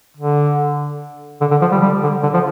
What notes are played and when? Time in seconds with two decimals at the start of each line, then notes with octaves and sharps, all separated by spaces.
0.17 D3
1.41 D3
1.51 D3
1.61 F3
1.72 G3
1.82 G3
2.03 D3
2.23 D3
2.34 F3